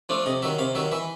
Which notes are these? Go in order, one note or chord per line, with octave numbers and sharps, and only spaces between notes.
F3 A3 D4
C3 D#5
D#3 F#3 E5
C3 F5
D#3 F#3 E5
E3 E5